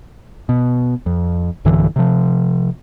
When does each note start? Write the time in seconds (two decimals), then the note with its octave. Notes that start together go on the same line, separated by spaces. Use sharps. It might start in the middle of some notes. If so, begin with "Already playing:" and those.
0.49 B2
1.06 F2
1.65 B1 G2 D3 E3
1.96 C3 F3